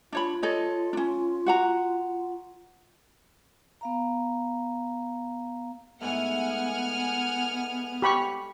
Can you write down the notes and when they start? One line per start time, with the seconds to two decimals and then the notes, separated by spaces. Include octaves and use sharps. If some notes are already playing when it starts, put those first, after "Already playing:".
0.12 D4 F4 C#5 B5
0.43 A4 C#5 D#5
0.93 C#4 D4
1.46 F#4 F#5 A#5
3.81 B3 F5 A#5
6.01 G#2 A3 B3 F#5 G#5 F6
8.02 G4 B5 C#6